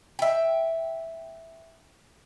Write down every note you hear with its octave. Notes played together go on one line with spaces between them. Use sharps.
E5 G5